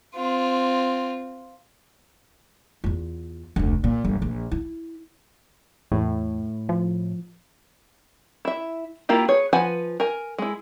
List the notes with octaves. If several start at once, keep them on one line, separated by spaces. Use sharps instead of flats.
C4 F4
E2 F4
F1 D2
A#2
G1
A#1
E4
E2 A2
F3
E4 E5
A#3 E4 F4 G4
G#4 B4 C#5
F3 B4 F#5 G#5
A#4 G#5
G#3 E4